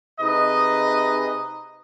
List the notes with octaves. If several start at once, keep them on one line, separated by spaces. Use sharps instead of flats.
C3 D#4 G#4 B4 D#5